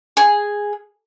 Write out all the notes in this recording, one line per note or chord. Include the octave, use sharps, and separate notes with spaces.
G#4